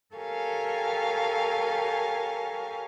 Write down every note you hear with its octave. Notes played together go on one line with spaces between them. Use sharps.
G4 A4 A#4 C#5 F5 G#5